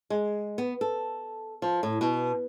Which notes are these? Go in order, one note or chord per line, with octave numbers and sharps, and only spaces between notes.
G#3
B3
A4
F3
A2
B2